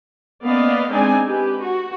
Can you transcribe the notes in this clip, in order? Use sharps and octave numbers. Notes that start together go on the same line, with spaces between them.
A#3 B3 C#4 D5 D#5 F5
G#3 C4 D4 D#4 D5 G#5
G4 B4
F#4